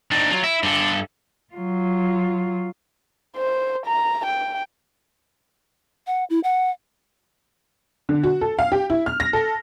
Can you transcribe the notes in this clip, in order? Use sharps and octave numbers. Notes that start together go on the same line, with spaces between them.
D#3 C4 D4 D#4
F#3 F4
E4 E5
G2 D3 A4
F#3 F4
C5
A#5
G5
F#5
E4
F#5
D3
F#4
A4
F5
G4
E4
F6
A#6
A4